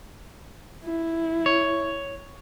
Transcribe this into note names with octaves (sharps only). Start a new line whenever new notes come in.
E4
C#5